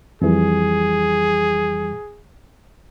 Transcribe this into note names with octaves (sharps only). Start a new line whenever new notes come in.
F2 E3 G3 G#4